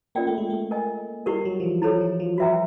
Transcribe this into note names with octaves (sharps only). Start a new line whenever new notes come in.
A#3 C#4 F4 A#4 D5 G5
A3
G#3
A3
A#4 D#5 G#5
G3 E4 G4 A#4
F#3
F3
E3
F3 E4 A4 C#5
E3
F3
F#4 B4 E5 G5 A#5